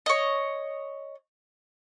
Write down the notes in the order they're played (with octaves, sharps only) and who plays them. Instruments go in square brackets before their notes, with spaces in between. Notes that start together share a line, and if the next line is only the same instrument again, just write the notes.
[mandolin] C#5 D#5